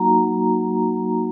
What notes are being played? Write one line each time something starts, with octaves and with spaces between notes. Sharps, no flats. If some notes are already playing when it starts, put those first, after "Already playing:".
Already playing: F#3 A#3 D#4 F#4 A#5